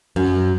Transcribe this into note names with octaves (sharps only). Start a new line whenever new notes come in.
F#2